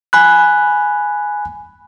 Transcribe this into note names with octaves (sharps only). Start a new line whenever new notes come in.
G#5 B5 F#6